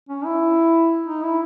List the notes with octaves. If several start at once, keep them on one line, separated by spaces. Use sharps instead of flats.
C#4
E4
D#4
E4